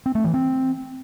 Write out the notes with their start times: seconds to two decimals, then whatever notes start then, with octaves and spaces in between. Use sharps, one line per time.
0.06 C4
0.15 A3
0.24 E3
0.34 C4